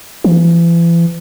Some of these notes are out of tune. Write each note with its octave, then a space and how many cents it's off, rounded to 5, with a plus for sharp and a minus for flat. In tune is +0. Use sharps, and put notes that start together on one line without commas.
E3 +40